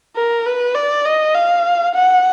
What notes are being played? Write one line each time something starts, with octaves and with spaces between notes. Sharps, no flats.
A#4
B4
D5
D#5
F5
F#5